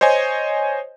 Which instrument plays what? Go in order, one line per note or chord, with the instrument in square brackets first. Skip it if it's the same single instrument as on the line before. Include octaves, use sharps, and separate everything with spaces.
[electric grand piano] C5 C#5 D#5 G#5